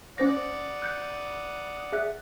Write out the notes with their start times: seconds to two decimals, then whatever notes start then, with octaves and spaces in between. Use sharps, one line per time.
0.18 C#4 C5 D5 F#5 D#6 A#6
0.82 F#6 G6 C#7
1.92 G#4 E5 F#6